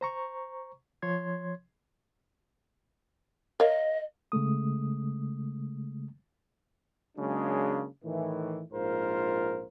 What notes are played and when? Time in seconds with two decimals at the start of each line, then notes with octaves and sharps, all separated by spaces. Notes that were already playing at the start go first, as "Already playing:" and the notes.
0.01 C5 A#5 C#6
1.02 F3 C#5 C6 G#6
3.60 A#4 C#5 D#5 F5
4.32 C#3 G#3 A3 D#6
7.17 C#3 F#3 G#3 A#3 D4
8.04 A2 D#3 E3
8.73 A#1 G#2 F4 A#4 C5